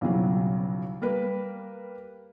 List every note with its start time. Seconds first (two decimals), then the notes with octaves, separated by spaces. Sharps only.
0.01 B1 F2 C#3 E3 F#3 G3
1.02 G3 A#3 A#4 B4